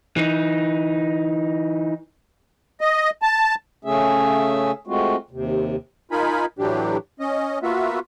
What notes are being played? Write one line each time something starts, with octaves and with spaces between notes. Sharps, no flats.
E3 D#4
D#5
A5
C#3 A3 C#4 G#4 E5
G#3 A3 C4 F4 F#4
D#2 C3
D#4 F4 A#4 G#5 B5
A2 E3 F#3 D4 G4
C#4 D#5
A#3 B3 F4 F#4 E5